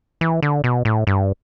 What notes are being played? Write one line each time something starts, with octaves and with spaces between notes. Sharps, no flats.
E3
D3
B2
A2
G2